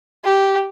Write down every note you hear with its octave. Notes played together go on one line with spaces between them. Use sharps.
G4